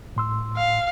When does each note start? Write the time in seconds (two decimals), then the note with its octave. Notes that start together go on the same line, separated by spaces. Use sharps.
0.16 A2 C6 E6
0.57 F5